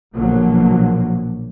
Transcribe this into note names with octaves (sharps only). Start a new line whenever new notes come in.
A#1 B2 D3 F3 F#3 A#3